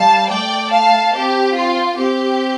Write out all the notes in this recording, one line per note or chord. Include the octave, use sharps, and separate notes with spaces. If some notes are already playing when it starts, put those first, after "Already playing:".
Already playing: G3 F5 A5
A3 D5 G5
F5 A5
C4 G4
F4
C4 G4